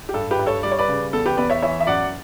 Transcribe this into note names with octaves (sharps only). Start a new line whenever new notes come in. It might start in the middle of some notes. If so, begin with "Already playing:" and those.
G4
G2 A4
G4 B4
G2
A4 C#5
G3 D5
C#5
B4 D5
C#3
E2 A4
G4 B4
E2 B4 D5
C#5 E5
E3 C#5 E5
E5
F#2 D5 F#5